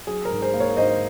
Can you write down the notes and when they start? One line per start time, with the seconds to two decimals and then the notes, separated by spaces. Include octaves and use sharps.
0.07 F#3 G#4
0.25 A#4
0.31 G#2
0.42 G#4 C5
0.54 A#3
0.60 A#4 C#5
0.77 G#2 C5 D#5